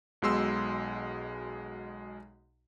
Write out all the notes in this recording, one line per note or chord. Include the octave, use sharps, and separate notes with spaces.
B1 B2 G#3 C6 E6